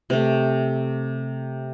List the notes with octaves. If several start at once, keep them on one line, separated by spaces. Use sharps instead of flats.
C3 A3